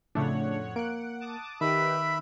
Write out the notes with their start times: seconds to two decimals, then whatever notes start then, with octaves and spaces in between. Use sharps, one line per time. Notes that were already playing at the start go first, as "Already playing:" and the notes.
0.15 F2 A2 C#3 A3 D4 C#5 F#5
0.76 A#3 F#5 F#6 D7
1.21 A5 D6 D#6
1.61 D#3 D#4 G4 B4 E5 B5